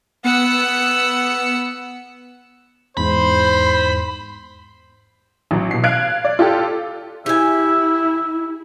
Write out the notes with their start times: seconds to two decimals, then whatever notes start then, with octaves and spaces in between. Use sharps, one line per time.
0.24 B3 F#5 E6 C#7
2.97 E2 G#2 C5 B5
5.51 A1 F#3
5.71 B2 C7
5.84 F5 F#6 G#6 D7
6.24 D5
6.39 F4 G4 A4
7.26 E4 G4 E5 G#5